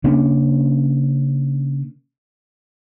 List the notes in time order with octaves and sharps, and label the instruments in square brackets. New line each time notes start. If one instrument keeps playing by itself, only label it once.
[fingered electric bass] C#3 A#3 C#4 D4